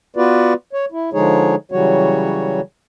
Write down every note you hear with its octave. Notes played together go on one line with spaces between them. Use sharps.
B3 F4 F#4 B4 D5
C#5
E4
D3 F3 G#3 D#4 G#4 C#5
C#3 E3 F#3 G3 F#4 C#5